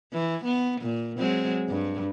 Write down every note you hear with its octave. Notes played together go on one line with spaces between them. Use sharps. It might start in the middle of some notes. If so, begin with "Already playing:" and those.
E3
B3
A#2
F#3 G#3 C4
G2